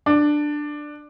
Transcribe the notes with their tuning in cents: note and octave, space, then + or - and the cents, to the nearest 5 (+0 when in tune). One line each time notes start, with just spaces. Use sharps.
D4 +10